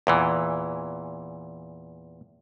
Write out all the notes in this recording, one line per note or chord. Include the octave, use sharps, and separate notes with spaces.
E2 A#2 E3